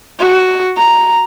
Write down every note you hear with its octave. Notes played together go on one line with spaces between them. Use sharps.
F#4
A#5